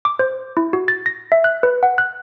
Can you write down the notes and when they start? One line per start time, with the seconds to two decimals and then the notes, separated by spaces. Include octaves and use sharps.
0.05 D6
0.19 C5
0.57 E4
0.73 F#4
0.88 A6
1.06 A#6
1.32 E5
1.44 F#6
1.63 B4
1.83 F#5
1.98 F#6